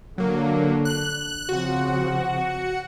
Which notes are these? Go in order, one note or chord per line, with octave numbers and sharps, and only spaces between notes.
D3 F#3 A#3
F#6
C#3 F3 C4 F#4 F#5